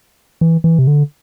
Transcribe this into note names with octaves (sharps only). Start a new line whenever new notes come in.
E3
E3
C3
D3